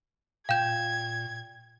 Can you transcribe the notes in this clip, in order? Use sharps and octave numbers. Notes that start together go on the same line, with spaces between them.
A#2 F5 G5 G6 G#6 E7